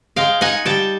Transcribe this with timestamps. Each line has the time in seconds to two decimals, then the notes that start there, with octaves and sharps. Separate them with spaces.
0.16 G#3 F5 G5
0.41 D#4 F#5 G#5
0.65 G3 G5 A5